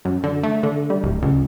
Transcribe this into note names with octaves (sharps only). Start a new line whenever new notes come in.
F#2
D3
A3
D3
G3
D1
C#2